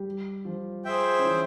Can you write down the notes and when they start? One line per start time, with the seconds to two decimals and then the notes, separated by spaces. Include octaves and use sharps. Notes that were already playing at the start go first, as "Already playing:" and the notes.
Already playing: G3 G4
0.45 F3 F4
0.85 G#4 C5 E5 G5
1.19 C#4
1.24 E3 E4